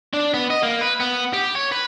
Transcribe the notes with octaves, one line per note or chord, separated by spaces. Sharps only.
D4
B3
D#5
A#3
B4
B3
G4
C#5
B4